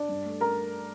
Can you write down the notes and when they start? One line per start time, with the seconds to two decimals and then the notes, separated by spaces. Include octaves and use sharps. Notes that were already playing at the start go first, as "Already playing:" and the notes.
Already playing: D4 D5
0.09 G2
0.25 A3
0.41 A#4 A#5